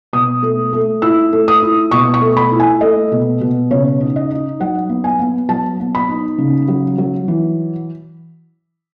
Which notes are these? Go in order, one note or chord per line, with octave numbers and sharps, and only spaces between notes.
B2 D#6
A3
A3
E4 E6
A3
D#6
E4
B2 C#6
C#6
A3
B5
E4
G#5
A3 D#5
B2
B2
C#3 C#5
D#4
D#5
D#4
F#3 F#5
B3
G#5
B3
F#3 A5
B3
B5
D#4
C#3
F#3
F#3
E3